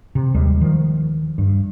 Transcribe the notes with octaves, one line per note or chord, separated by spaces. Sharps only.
C3
D#2 G3 G#3
D#3 F3
G2